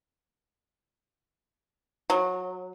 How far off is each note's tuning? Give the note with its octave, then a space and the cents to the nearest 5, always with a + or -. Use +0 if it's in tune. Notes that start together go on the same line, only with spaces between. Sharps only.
F#3 -20